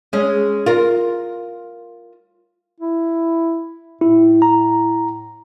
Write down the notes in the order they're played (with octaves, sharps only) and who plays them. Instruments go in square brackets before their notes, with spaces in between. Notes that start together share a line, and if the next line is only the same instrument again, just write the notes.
[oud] G#3 C#4
F4 A#4
[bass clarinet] E4
[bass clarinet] A2 [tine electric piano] E4
[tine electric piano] A#5